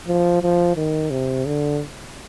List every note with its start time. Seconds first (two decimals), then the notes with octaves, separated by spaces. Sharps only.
0.08 F3
0.43 F3
0.76 D#3
1.11 C3
1.46 D3